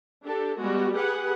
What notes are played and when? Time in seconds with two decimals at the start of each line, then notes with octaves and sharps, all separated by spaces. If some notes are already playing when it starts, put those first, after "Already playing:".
0.24 D4 G4 A4
0.58 G3 G#3 B3 F#4
0.94 G4 G#4 B4 F#5